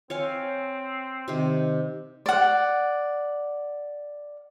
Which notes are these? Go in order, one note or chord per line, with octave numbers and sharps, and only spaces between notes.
C4 C#5 F5 G#5
C3 D#3
D5 F#5